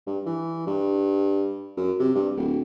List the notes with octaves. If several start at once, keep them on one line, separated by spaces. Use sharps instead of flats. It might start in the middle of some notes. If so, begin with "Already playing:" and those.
G2
E3
G2
F#2
C3
G2
D1